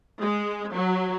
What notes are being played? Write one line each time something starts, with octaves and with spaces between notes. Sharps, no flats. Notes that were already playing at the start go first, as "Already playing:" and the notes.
G#3
F#3